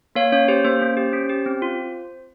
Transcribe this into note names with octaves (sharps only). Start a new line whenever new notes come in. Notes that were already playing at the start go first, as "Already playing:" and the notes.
A#3 C#5 F5
C#4 C#5
G4 C5
A#3 C5
C#4
G4
C#4
G4
C4
F4